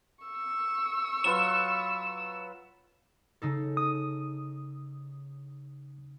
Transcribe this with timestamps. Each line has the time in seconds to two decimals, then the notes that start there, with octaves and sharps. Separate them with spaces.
0.25 C#6 E6
1.24 F#3 F4 B4 E7
3.42 C#3 D#4 A4
3.77 D#6